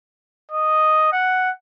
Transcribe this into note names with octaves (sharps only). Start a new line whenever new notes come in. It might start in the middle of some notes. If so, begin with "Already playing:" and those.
D#5
F#5